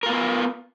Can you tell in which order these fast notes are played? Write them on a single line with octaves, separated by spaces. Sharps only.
A#4 F4 B3